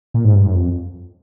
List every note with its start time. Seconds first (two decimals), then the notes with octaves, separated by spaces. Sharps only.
0.14 A#2
0.25 G#2
0.35 G2
0.45 F#2
0.55 F2